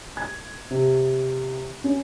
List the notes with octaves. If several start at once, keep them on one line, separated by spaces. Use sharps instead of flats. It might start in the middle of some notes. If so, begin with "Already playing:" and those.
G#6
C3
C#4